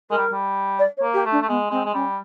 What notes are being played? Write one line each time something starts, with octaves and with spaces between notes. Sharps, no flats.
G#3 A#4
G3
G3
D5
C#5
A#3
G4
A3
D4
A3
G#3 B3
G#3 C4
G#3
G3 C#4